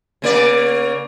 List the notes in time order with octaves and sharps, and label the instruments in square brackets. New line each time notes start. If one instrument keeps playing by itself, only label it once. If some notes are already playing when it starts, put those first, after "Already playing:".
[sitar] C#3 A#3 D5